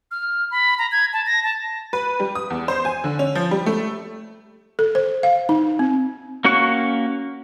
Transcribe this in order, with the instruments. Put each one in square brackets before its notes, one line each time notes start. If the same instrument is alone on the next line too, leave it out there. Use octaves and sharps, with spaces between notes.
[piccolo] F6
B5
A#5
G#6
A5
A#6
A5
[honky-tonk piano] B4
G3
D#6
E2
C5
G#5
D3
C#4
F3
G3
A3
[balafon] A4
C5
F5
D#4
C4
[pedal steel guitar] A#3 C#4 F#4 F#5 C#6